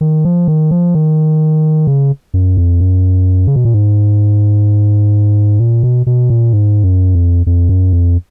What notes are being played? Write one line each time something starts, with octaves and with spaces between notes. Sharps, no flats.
D#3
F3
D#3
F3
D#3
C#3
F#2
F2
F#2
C#3
B2
A#2
G#2
A#2
B2
B2
A#2
G#2
F#2
F2
F2
F#2
F2